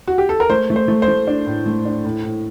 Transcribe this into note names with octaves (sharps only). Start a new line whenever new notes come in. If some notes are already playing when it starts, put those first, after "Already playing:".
F#4
G4
A4
A#4
A3 C5
A3
C5
A3
C5
A3
D4
A2
A3
D4
A2
A2